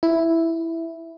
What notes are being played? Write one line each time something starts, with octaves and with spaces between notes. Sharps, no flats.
E4